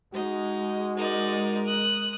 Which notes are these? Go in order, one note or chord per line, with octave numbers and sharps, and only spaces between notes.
G#3 D#4 F#4 D#5
D#4 A#4 D5
D#6 F#6